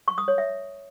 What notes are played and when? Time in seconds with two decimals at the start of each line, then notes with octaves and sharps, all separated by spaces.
0.08 C#6
0.18 D#6
0.28 C#5
0.38 E5